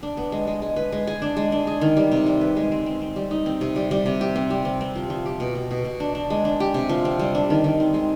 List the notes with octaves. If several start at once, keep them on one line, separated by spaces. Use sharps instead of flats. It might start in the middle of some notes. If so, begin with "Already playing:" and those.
D4
B3
G#3
G#3
G#3
B4
G#3
G#4
D4
G#3
D4
G#4
D#3
G3
C3
G3
B4
G#3
C4
C4
C4
G3
D#4
C4
C3
G3
G3
C3
G4
C4
G3
C4
C4
F3
F3
G4
B2
B2
B2
B2
D4
D4
G#3
D4
G4
C3
F3
C4
G3
D4
D#3
D#3
C4
G#3